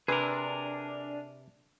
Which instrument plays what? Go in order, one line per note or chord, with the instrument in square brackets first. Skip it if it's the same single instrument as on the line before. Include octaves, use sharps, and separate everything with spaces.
[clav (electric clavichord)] C3 [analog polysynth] D4 [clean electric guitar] G#4 A#4 [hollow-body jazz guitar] B4